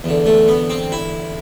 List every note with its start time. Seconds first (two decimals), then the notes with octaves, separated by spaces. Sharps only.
0.04 E2 D3
0.26 A3
0.48 B3
0.70 C4
0.92 E4